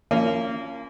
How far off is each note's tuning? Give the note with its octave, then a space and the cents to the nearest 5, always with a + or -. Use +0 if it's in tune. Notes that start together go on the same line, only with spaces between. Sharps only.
F3 -40 A#3 -25 C#4 +0